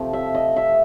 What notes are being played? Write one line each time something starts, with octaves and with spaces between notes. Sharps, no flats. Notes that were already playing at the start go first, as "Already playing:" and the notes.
Already playing: C3 F3 A3
E5
D#5
E5